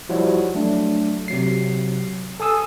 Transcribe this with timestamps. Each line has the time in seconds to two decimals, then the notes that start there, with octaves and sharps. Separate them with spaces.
0.09 F3 G3 E4 F#4 C#5
0.55 F#3 A3 D4
1.28 C3 F#3 C7
2.40 A4 G#5 D#6 E6